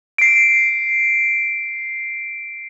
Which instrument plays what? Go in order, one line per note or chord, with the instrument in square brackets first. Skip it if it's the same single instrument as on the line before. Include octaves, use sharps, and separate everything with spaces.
[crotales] C7 D7